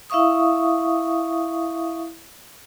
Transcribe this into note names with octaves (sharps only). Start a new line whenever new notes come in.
E4 E5 F5 C#6 D#6